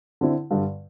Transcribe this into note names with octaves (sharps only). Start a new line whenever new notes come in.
D3 C4 E4
G2 D3 G3